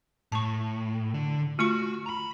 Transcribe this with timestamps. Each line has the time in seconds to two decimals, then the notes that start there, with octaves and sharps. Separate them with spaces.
0.32 A2 A5 C#6
1.14 D3
1.59 A3 F4 F#4 C#6
2.06 A#5 B5